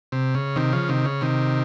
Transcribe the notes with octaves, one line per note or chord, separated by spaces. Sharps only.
C3
C#3
C3 D#3
C#3 F3
C3 D#3
C#3
C3 D#3